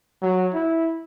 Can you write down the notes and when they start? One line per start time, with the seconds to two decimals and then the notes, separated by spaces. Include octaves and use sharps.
0.23 F#3
0.54 E4